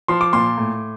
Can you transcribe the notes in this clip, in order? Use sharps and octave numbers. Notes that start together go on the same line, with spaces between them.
F3 C6
D6
A#2 C6
A2